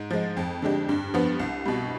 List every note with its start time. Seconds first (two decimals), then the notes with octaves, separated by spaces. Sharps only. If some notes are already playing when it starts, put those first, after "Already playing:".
Already playing: G#2
0.11 F3 G#3
0.37 F2
0.62 D3 G#3 D4 G4
0.89 G2
1.14 F3 B3
1.40 C2
1.66 B2 G3